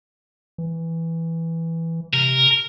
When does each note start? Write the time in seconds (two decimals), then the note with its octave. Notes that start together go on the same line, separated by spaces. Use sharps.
0.58 E3
2.13 C3 A#4